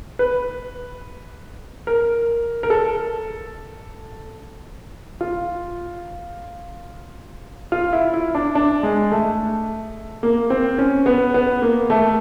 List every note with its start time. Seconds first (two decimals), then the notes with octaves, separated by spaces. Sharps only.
0.19 B4
1.87 A#4
2.63 A#4
2.70 A4
5.21 F4
7.72 F4
7.93 E4
8.14 E4
8.35 D4
8.55 D4
8.83 G#3
9.12 A3
10.23 A#3
10.50 C4
10.78 C#4
11.06 B3
11.34 B3
11.62 A#3
11.90 A3